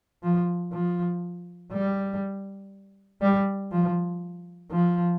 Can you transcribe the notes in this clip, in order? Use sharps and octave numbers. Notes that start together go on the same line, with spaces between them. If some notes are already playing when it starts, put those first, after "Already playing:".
F3
F3
G3
G3
F3
F3